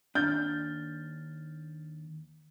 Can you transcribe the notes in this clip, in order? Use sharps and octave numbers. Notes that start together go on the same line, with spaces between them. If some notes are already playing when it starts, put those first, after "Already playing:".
D#2 D4 F6 G6 A6